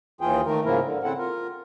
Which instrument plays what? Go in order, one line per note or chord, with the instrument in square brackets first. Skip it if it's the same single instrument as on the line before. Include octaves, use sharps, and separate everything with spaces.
[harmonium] D#2 E3 F4 G#4 G5
D#3 A3 A#4
G#2 C#3 F3 A#3 E4 A#4
D3
C#3 C4 E4 A4 F#5
F4 A#4